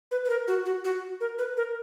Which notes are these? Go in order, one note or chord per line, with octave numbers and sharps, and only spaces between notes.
B4
B4
A#4
F#4
F#4
F#4
A#4
B4
A#4